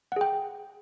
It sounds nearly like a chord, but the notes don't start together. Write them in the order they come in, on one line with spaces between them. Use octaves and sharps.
F#5 G#4 G5